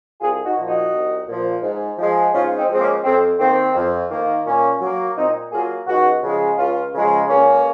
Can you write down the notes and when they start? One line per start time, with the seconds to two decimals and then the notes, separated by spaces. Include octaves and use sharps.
0.21 C2 F4 G#4
0.45 D#4 F#4
0.56 A#2 F3
0.68 D#4 F#4
0.92 C2
1.27 A#2 F3
1.62 G#2
1.98 F3 G#3
2.33 G#2 C#4 F4
2.56 C4 D#4
2.68 F3 G#3 C4
2.80 A#3 C#4
3.04 F2 C4
3.39 D#3 A#3 C4
3.75 F2
4.11 D#3 A#3
4.46 A#2 A#3 C#4
4.81 F#3 A#3
5.16 A#2 C4 D#4
5.51 F#3 A#3 F4 G#4
5.87 C#2 D#4 F#4
6.23 C#3 F3 G#3
6.57 C#2 C#4 F4
6.93 C#3 F3 G#3
7.28 C#2 A#3 C#4